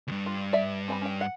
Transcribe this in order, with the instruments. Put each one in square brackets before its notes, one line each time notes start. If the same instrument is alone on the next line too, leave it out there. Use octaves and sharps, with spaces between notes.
[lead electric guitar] D2 G2
[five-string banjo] F4
D5 E5
C4 G#5 B5
C#4 G5
F#5